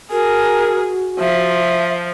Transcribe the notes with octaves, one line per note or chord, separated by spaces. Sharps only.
F#4 G#4 A#4
F3 E5